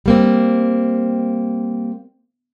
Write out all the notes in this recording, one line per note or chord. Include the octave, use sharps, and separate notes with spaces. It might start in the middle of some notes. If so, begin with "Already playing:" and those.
G3 A#3 C4